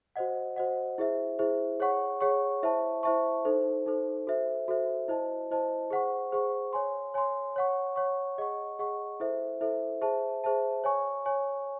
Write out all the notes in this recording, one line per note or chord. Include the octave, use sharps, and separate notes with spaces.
F#4 C5 D#5 F#5
F#4 C5 D#5 F#5
E4 G#4 C5 E5
E4 G#4 C5 E5
G#4 C#5 F#5 C#6
G#4 C#5 F#5 C#6
E4 C5 E5 A5 C#6
E4 C5 E5 A5 C#6
D#4 A4 C5
D#4 A4 C5
F#4 A4 C5 E5
F#4 A4 C5 E5
E4 C5 D#5 A5
E4 C5 D#5 A5
G#4 C5 F#5 C#6
G#4 C5 F#5 C#6
C#5 G#5 C6
C#5 G#5 C6
C#5 F#5 C#6
C#5 F#5 C#6
G#4 D#5 F#5 C#6
G#4 D#5 F#5 C#6
E4 A4 C5 E5
E4 A4 C5 E5
G#4 C5 E5 A5
G#4 C5 E5 A5
C#5 G#5 C#6
C#5 G#5 C#6